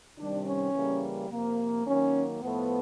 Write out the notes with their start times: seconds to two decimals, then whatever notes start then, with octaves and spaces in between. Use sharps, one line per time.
0.18 C3 D#3 G3 D4
0.46 C#4
0.74 C#3 E3 G3 A#3
1.30 C3 F3 A#3
1.86 D#3 F#3 A#3 C#4
2.42 A2 F3 A3 B3